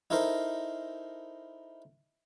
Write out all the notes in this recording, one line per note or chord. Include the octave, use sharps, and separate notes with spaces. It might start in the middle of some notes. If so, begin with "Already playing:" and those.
D#4 E4 A4 A#4 C5